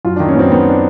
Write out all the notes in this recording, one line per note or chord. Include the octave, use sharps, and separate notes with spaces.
F#2 F4
D4
D#3
C#4
F#2 B3 C4
D#3 B3
D4